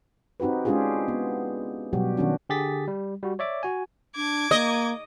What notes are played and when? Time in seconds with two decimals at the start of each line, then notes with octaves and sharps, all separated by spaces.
0.40 C4 D#4 F#4 G4 B4
0.65 G#3 C#4 D4 F4 G4 G#4
1.08 B3
1.93 B2 F#3 G3 F#4 G4
2.17 D#3 B3 C#4 D4 F#4
2.50 D3 G4 G#4 A6 B6
2.88 G3
3.23 G3 F#4
3.39 C#5 D5 E5 D6
3.63 F#4 G#5
4.16 D4 D6 G#6
4.51 A#3 D#5